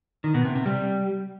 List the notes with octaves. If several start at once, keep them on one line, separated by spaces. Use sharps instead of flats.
D#3
B2
C3
C3
G3